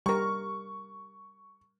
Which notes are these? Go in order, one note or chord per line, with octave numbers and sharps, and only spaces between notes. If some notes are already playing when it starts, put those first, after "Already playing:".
G3 A#4 C#6